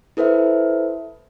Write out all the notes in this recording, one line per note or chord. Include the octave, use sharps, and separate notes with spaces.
E4 A4 B4 C5 E5